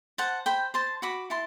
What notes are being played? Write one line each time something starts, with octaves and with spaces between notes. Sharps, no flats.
C5 F#5 A5
C5 G5 B5
C5 A5 C6
F#4 B5 D6
E4 A5 C6